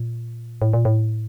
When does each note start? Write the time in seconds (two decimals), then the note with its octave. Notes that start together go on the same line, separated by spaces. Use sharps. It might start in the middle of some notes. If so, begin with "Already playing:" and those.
Already playing: A#2
0.62 A2
0.73 A#2
0.85 A2